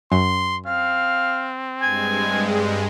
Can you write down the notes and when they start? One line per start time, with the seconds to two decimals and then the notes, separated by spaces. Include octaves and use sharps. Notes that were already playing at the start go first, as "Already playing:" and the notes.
0.12 F#2 C6
0.66 C4 F5
1.82 G2 G#3 G#5